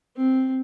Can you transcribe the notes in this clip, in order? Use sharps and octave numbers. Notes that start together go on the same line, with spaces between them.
C4